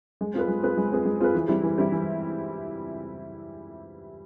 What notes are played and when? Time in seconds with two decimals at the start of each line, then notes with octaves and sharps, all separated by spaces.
0.21 G#3
0.34 C4 F4 G#4 B4
0.48 G#3
0.63 C4 F4 G#4 B4
0.77 G#3
0.92 C4 F4 G#4 B4
1.05 G#3
1.20 C4 F4 G#4 B4
1.35 E3
1.48 G3 C4 E4
1.63 E3
1.78 G3 C4 E4
1.92 E3